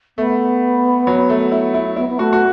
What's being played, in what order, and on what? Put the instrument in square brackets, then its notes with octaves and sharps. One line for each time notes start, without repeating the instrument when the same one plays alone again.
[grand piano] A3 [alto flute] B3
[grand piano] F#3
A3
E4
E4
[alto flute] B3 [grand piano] E4
[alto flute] B3
[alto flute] A3 [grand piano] F#4
[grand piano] F#4